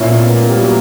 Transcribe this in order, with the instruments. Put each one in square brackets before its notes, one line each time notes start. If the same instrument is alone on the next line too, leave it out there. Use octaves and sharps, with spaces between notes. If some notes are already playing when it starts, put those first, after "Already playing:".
Already playing: [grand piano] A#2 A#3 E4 [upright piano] C#4
[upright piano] B3
A#3
G3
F#3